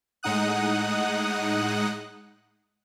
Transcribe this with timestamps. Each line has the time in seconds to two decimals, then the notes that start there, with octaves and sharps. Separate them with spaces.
0.23 A2 G#3 D#4 F#5 D#6 F#6